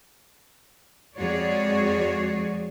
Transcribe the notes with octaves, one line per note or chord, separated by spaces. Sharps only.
F2 G#3 F#4 G#4 C#5 D5